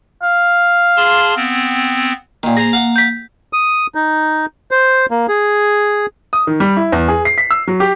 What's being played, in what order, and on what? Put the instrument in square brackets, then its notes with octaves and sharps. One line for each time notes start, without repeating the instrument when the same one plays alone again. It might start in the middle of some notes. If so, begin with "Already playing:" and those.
[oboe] F5
[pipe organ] G#4 A5 C6
B3 C4
[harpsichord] A#2 D#3 [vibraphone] A#3
[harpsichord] G#4 C5 A#5 [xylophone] A#6
[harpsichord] F5 F#5
[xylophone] G6 B6
[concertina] D#6
D#4
C5
A#3
G#4
[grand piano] D#6
D#3
G3
E4
E2
G#4
C7
B6
E6
F#3
G4